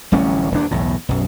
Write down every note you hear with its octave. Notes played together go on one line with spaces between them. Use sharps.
D1 A1 G3 C#4
D#1 E2 D4
B1 E2 A2
B1 F#2